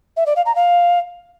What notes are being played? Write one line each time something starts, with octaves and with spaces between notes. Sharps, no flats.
E5
D5
F5
A#5
F5